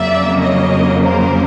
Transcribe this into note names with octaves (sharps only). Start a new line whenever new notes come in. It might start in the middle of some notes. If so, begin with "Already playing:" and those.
Already playing: F2 C#3 F#3 A#3 D5 E5
C#5 D#5
A#4 C5